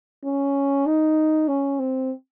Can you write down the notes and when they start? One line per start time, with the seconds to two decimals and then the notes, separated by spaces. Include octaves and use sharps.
0.24 C#4
0.86 D#4
1.48 C#4
1.79 C4